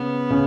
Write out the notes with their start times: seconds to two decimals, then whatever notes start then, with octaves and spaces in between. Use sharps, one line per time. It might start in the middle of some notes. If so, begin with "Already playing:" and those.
Already playing: C#3 B3
0.30 C#3